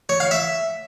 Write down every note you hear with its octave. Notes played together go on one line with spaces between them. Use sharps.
C#5
F5
E5